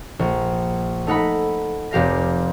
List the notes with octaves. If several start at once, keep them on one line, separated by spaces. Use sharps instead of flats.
A#1
A3 D#4 F#5 B5
F1 G4 F5 A#6